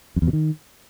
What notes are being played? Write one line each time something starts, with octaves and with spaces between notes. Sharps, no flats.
F2
E2
B2
D#3